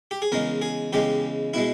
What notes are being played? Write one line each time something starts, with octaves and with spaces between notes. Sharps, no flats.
G4
G#4
E2 C#3 G#3 A#4
G#4
E2 C#3 G#3 G4
B2 G#3 E4